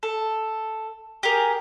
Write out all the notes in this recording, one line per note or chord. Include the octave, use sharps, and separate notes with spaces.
A4
G4 G#4 A#4